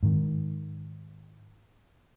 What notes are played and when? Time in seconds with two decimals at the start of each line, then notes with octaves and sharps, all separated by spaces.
0.03 G#2 D#3